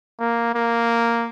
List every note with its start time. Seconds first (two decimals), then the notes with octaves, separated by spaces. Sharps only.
0.20 A#3
0.55 A#3